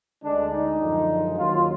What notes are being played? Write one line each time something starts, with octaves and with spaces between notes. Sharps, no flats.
D2 D3 G#3 D4
D#4
F#2 D3 F3 G#3
D#2 D#3 F#3 F4